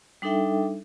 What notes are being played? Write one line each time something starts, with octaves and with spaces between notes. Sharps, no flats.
G3 D4 D#4 A4 E5 G5